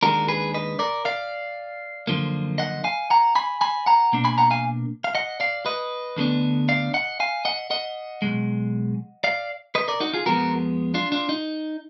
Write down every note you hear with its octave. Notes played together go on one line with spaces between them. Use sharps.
D#2 D#3 G#3 D4 F#4 A#4
G#4 B4
B4 D#5
A#4 D5
D5 F5
F#2 D3 F3 A#3
D#5 F#5
F5 G#5
F#5 A#5
G#5 B5
G#5 B5
F#5 A#5
B2 A#3 D4
G#5 B5
F#5 A#5
F5 G#5
F5
D#5 F#5
D5 F5
B4 D#5
D2 D3 G#3 B3 D4
D5 F5
D#5 F#5
F5 G#5
D#5 F#5
D#5 F#5
B1 A#2 G#3
D5 F5
B4 D#5
A#4 D5
D#4 F#4
F4 G#4
F2 F3 G#3 B3 F#4 A#4
D4 F4
D4 F4
D#4